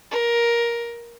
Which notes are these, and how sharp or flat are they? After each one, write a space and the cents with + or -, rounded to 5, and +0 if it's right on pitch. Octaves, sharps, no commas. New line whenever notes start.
A#4 +15